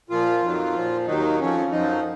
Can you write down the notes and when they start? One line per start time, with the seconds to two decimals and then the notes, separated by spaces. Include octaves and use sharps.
0.10 A#2 F3 F4
0.42 F2 D#3 F#3
0.74 A#2 F3
1.07 D#2 D#3 F#3 D#4
1.40 F2 F3 C#4
1.71 F#2 F3 D#4